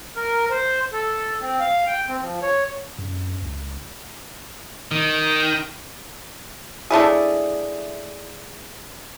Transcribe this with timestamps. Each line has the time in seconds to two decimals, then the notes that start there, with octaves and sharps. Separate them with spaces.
0.16 A#4
0.50 C5
0.93 A4
1.41 C4
1.60 F5
1.87 G5
2.08 C4
2.21 F3
2.42 C#5
2.99 F#2
3.42 C#2
4.91 D#3
6.91 A3 D4 E4 G#4